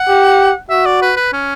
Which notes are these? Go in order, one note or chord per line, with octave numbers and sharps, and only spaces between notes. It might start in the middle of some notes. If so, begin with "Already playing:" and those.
Already playing: F#5
G4
F#4 E5
D5
B4
B4
C#4